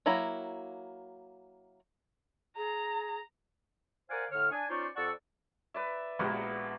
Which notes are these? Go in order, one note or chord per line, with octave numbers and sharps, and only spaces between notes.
F#3 A#3 E4 A#5
G#4 A#5
A#4 C5 D5 F5 F#5 G#5
A2 D3 C#5 F6
D4 G#5
C#4 D#4 F4 C5 D5 C#6
F2 D5 F#5 A5 C#6 E6
B4 D5 E5
A#1 G#3 A#3 B3 F#4 G4